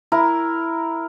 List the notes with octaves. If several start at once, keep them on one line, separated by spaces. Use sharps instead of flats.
E4 A#4